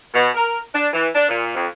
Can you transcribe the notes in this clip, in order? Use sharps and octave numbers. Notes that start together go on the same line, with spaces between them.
B2
A#4
D4
E3
D4
A#2
F2